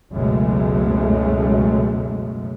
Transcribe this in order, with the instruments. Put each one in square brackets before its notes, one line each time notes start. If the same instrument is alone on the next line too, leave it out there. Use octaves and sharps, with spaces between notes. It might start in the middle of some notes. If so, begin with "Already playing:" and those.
[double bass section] F#1 C#2 F#2 B2 G#3 A3